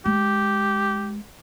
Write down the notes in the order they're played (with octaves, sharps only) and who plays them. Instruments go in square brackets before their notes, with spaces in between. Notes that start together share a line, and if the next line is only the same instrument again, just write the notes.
[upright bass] G#3 [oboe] G4